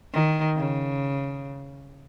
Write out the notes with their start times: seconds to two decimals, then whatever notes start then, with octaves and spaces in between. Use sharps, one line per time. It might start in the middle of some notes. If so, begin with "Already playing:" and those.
0.13 D#3
0.56 C#3